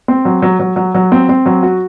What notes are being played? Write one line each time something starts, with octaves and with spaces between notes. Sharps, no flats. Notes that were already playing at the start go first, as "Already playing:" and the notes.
C4
F#3
F#3
F#3
F#3
F#3
C4
C4
F#3
F#4